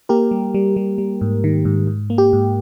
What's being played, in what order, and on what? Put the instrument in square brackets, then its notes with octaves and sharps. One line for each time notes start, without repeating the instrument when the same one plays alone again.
[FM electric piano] A#3 G4 A#4
G3
G3
G3
G3
G#2
D#3
G#2
G#2
A#3
G4
G#2